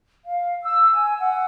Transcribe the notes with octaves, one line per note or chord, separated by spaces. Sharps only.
F5
E6
G#5
F#5